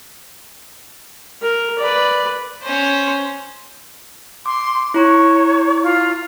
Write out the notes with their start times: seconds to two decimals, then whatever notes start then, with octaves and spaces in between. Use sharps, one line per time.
1.42 A#4
1.79 B4 D5
2.63 C#4 C5
4.46 C6 D6
4.94 E4 C#5 A#5 C#6
5.83 F4